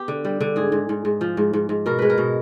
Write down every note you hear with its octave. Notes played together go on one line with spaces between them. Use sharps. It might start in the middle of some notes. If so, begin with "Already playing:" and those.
Already playing: B3 G4
D3
G3
D3
G#2 G#4
G#2
G#2
G#2
F3
G#2
G#2
G#2
B2 A#4
G#3 B4
A#4
B2